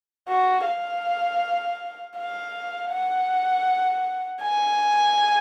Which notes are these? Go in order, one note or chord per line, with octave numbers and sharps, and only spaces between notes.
F#4
F5
F5
F#5
G#5